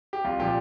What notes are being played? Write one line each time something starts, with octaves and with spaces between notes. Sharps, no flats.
G4
C2 F4
A#2 F3 G4